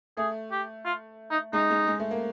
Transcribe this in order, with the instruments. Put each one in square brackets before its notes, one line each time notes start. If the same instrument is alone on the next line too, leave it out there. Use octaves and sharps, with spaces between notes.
[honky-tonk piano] A3 [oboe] G#4
[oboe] G4
F4
D#4
[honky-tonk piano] G#3 [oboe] D#4
[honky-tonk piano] G#3
G#3
A3
A#3